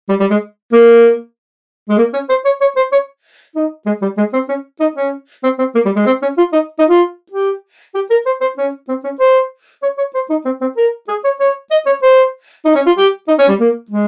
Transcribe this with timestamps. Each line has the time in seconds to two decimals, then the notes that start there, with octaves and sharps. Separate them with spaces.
0.09 G3
0.20 G3
0.30 G#3
0.72 A#3
1.89 G#3
1.98 A#3
2.13 C#4
2.29 C5
2.45 C#5
2.61 C#5
2.76 C5
2.92 C#5
3.55 D#4
3.86 G#3
4.02 G3
4.17 G#3
4.33 C4
4.49 C#4
4.80 D#4
4.95 C#4
5.43 C4
5.59 C4
5.75 A#3
5.85 G3
5.96 G#3
6.06 C4
6.22 C#4
6.37 F4
6.53 D#4
6.79 D#4
6.89 F4
7.31 G4
7.94 G4
8.10 A#4
8.26 C5
8.41 C5
8.57 C#4
8.88 C4
9.04 C#4
9.20 C5
9.83 C#5
9.98 C#5
10.14 C5
10.29 D#4
10.45 C4
10.61 C4
10.77 A#4
11.08 G#4
11.24 C#5
11.40 C#5
11.71 D#5
11.86 C#5
12.02 C5
12.65 D#4
12.75 C#4
12.86 F4
12.97 G4
13.28 D#4
13.38 C#4
13.48 G3
13.60 A#3
13.91 G#3